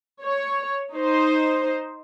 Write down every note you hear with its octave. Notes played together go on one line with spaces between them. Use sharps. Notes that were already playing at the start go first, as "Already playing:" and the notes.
C#5
D#4 C5